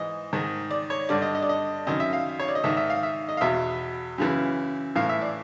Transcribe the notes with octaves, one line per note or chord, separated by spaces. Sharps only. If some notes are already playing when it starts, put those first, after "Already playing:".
Already playing: G#2 E3 D#5
G#2 D#3
D5
C#5
G2 D3 D5
D#5
D#5
D5
D#5
F#2 D#3 D#5
E5
F5
C#5
D5
D#5
G#2 D#3 E5
E5
F5
E5
D#5
F5
E2 B2 E5
F#2 C#3 E3
A2 E3 F5
E5
D5